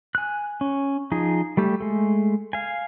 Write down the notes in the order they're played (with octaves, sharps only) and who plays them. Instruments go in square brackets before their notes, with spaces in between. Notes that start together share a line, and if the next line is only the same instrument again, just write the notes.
[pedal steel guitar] G#5 F#6
C#4
F3 D#4 G#4
G3 A3 G4
G#3 A3
F5 G#5